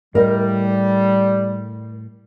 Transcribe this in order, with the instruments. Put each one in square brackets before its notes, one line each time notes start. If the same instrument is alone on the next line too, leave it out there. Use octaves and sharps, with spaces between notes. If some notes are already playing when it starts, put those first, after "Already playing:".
[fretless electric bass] A2 [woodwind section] G3 [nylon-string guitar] A#4 D#5